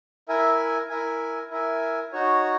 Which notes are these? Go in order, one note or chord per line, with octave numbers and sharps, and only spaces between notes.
E4 A#4 E5 G#5
E4 A#4 E5 G#5
E4 A#4 E5 G#5
D#4 F#4 C#5